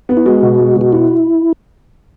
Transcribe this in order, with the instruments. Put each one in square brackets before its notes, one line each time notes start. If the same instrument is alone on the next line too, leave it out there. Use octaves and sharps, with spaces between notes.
[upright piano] B3
[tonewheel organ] E4
[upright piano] G#3 [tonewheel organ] F#4
[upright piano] B2
G#3
[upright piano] B2 [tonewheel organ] F#4
[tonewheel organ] E4 [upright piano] F#4